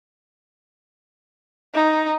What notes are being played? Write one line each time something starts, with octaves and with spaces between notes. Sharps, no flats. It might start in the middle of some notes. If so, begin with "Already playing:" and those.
D#4